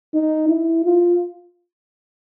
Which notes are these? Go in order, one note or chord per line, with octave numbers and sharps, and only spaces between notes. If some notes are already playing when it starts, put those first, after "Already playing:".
D#4
E4
F4